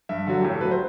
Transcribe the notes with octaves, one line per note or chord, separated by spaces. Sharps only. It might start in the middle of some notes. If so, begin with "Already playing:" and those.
G2 E5
D3 F#3
A2 G4
A4
F#3 B4
C5